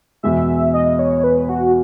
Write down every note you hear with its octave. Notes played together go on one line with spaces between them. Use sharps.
E2 B2 G#3 E5
D#5
C#5
B4
F#4